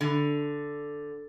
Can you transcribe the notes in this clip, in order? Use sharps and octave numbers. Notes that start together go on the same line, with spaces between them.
D3